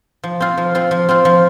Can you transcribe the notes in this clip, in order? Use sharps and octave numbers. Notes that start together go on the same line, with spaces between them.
F3
C4 F4
F3
C4 F4
F3
C4 F4
F3